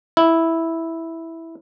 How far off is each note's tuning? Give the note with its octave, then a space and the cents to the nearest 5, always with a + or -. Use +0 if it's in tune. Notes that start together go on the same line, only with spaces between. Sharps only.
E4 -5